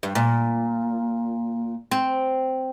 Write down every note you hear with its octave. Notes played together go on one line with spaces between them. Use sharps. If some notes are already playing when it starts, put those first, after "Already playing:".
G2
A#2
C4